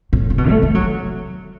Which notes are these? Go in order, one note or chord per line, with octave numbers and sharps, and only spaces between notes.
A2
C#3
B2
A3
A3
F#3